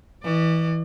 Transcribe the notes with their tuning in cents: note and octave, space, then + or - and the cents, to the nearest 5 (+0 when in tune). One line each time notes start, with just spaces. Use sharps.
E3 -15 D5 +40